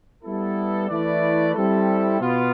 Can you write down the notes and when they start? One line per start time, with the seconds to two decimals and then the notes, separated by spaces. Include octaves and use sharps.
0.23 G3 B3 E4 A4
0.88 E3 A3 E4 B4 D5
1.54 G3 C4 E4 A4
2.21 B2 B3 F4